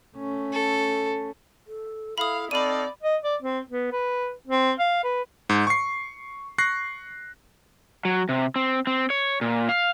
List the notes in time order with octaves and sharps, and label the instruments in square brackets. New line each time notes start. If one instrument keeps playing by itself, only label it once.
[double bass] A3 C#4
[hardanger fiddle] A4
[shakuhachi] A4
[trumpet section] E4 [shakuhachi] A4 [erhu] F5 [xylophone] B5 D#6
[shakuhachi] C4 [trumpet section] D#4 A4 F5 [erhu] D5 [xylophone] B5 D#7
[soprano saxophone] D#5
D5
C4
B3
B4
C4
F5
B4
[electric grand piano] G#2
C#6 C7
C#6 F#6 A#6 C7
[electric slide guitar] F#3
C3
C4
C4
C#5
A#2
F5